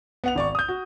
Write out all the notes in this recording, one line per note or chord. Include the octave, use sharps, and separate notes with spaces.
B3 F#5 F7
G#1 D5 C#6
D#6 G6
F#4